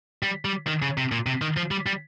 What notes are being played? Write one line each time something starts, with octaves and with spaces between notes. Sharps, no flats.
G3
G3
D#3
C#3
C3
A#2
C3
D#3
F3
G3
G3